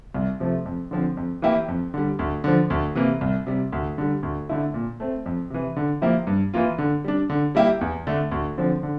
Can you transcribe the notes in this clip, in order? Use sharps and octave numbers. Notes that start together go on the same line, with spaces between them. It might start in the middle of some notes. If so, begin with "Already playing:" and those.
C2
C3 F3 A3
F2
D3 F3 C4
F2
E3 A#3 E4 G4
F2
D3 G3
D2
D3 F3
D2
C3 E3 A#3
C2
C3 G3
D2
D3 G3
D2
D3 A3 E4
A#2
A3 C4
F2
C3 E3
D3
F3 A#3 E4 G4
G2
E3 A#3 F4
D3
G3 D4
D3
G3 A#3 E4 G4
E2
D3 A3 D4
D2
D3 F3 C4
D3